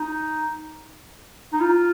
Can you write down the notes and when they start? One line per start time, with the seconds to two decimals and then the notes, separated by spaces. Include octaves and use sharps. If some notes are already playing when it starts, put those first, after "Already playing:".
Already playing: D#4
1.53 D#4
1.61 F4